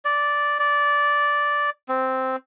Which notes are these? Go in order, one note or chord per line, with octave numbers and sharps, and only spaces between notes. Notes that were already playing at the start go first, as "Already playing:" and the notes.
D5
D5
C4